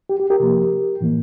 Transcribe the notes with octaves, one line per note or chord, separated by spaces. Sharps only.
G4
G4
G4 A#4
C3 F3 A#3
A2 E3 A#3